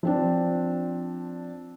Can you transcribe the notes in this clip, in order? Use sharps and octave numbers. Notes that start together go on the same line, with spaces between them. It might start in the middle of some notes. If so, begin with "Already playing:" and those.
F3 C4 D4